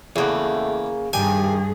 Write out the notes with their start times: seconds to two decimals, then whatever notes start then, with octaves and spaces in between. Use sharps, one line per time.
0.16 E2 C#3 A3 A#3 F#5
1.13 G2 D#3 G4 G#4 G#5